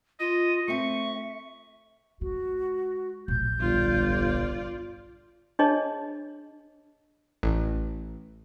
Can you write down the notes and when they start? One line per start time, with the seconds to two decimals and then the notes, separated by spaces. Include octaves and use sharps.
0.20 F4 D#5
0.68 A3 C4 E5 C#6
2.21 G#3 F#4
3.28 D1 A#1 G6
3.60 G1 F4 D5
5.59 D4 G#4 C#5 D#5 A5
7.43 A1